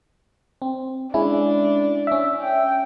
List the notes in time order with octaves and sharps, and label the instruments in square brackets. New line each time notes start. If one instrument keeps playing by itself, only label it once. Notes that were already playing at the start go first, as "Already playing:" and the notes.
[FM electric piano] C4
[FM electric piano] G#3 C#4 E4 [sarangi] D4
[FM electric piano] C#4 E5
[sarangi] G5